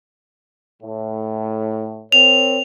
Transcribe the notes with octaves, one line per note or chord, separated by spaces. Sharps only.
A2
C4 A#4 C#5 F7